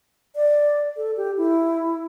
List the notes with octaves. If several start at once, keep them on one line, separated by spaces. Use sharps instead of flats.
D5
A4
G4
E4